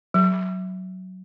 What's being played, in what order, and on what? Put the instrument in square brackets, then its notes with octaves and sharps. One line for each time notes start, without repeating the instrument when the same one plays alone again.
[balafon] F#3